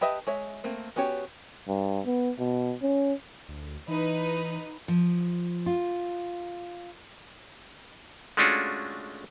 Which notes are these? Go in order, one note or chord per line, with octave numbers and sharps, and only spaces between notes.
G4 B4 D#5 E5 A5
G#3 C#5 E5
A3 A#3 C4
B3 C#4 F#4 G4 C#5
G2
B3
B2
C#4
D2
E3 D#4 B4
F3
F4
G#3 A3 C#4 D4 F4 F#4